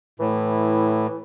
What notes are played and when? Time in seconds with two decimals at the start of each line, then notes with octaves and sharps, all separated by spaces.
0.20 A2 E3